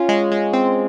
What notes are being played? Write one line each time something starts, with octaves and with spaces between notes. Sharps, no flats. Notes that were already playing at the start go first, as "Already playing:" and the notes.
Already playing: C#4 F4
G#3
G#3
C4